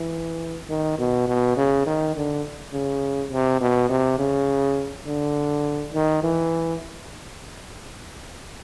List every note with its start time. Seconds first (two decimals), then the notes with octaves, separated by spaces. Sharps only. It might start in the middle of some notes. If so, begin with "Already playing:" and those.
Already playing: E3
0.69 D#3
0.98 B2
1.28 B2
1.56 C#3
1.86 D#3
2.16 D3
2.73 C#3
3.32 C3
3.61 B2
3.89 C3
4.18 C#3
5.07 D3
5.94 D#3
6.23 E3